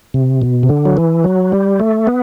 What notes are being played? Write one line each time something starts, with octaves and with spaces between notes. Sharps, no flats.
C3
B2
C3
D3
F#3
E3
F#3
G3
A3
B3